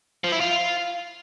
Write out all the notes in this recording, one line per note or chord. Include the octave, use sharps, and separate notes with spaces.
F3
E4
F4